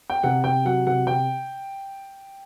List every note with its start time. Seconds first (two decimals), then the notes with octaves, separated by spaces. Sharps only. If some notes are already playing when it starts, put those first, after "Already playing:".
0.10 G5
0.23 C3 F#5
0.44 C3 G5
0.65 F#3 F#5
0.87 C3 F#5
1.07 C3 G5